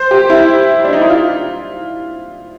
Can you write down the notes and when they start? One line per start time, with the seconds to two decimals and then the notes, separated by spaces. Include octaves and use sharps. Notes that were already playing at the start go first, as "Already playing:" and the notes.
Already playing: C5
0.11 G4
0.30 E4
0.85 D4
0.93 D#4
1.01 E4
1.10 F4